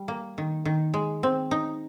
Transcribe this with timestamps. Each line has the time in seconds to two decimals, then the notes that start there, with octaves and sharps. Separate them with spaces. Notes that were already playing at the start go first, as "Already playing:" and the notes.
Already playing: G3
0.08 A#3
0.38 D#3
0.65 D#3
0.94 G#3
1.23 C4
1.51 D#4